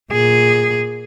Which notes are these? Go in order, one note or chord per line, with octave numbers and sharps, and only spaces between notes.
A#2 G#4